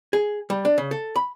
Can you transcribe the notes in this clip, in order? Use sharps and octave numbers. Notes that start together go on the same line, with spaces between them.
G#4
G3
D4
C#3
A4
B5